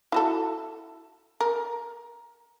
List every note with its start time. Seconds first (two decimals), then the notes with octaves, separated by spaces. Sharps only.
0.12 E4 F#4 A4
1.40 A#4